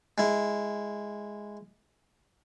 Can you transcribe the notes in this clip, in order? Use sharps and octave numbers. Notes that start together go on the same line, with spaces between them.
G#3 E4